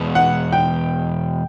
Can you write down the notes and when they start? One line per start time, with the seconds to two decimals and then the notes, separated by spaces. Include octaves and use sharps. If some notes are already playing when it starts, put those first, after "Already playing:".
Already playing: E2 B2 G#3 B3
0.15 F#5
0.53 G5